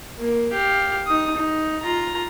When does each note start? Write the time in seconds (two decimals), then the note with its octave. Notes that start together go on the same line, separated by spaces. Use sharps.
0.19 A#3
0.53 G4 F5
1.07 D#4 D#6
1.36 D#4
1.83 F4 A#5